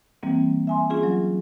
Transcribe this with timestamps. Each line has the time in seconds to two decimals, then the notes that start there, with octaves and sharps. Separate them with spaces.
0.23 E3 G3 A#3 C4
0.67 E5 G#5 C6
0.90 C#4 F4 G#4
1.03 F#3